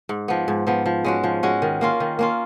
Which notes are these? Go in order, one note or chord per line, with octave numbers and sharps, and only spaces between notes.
G#2
F3 B3
G#2
F3 B3
F3
G#3 C#4 F#4
F3
G#3 C#4 F#4
D#3
A#3 C#4 F4
D#3
A#3 C#4 F4